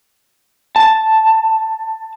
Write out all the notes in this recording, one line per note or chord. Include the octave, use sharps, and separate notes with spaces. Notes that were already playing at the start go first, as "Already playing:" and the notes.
A5